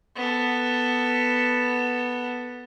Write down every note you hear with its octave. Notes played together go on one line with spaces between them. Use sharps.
B3 A4